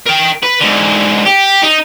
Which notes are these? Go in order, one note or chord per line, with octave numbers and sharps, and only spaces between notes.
A#4 G5
B4
G#2 D3
G4
D#4